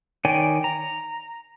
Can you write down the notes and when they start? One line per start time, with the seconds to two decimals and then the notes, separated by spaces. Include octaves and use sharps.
0.25 D#3 C#5 D5 G5 G#5
0.64 A#5